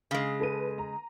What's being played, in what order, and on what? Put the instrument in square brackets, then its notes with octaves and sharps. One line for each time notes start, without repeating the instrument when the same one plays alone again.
[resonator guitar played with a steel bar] C#3 G#3
[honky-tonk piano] A4 B4 D#7
A#5